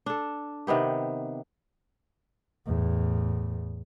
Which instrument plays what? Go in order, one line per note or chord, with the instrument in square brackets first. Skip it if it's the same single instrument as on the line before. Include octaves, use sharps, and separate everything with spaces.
[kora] D4 A4
C3 D#3 B3 G4
[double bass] E2 A2